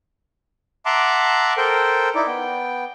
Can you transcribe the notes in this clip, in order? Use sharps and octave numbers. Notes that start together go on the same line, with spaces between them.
E5 F#5 A5 A#5 C6 D6
A4 A#4 C5 G5
D#4 E4 D5
B3 G5